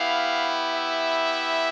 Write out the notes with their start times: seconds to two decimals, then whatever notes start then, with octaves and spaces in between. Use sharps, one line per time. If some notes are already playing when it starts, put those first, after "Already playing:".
Already playing: B3 E4 G4 F5
0.75 E5